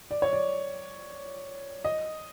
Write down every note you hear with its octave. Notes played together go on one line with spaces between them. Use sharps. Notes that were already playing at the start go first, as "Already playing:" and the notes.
D5
C#5
D5
D#5